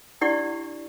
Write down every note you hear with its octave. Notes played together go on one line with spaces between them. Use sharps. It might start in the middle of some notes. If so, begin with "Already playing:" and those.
D4 E4 G4 D5 F#5 C#6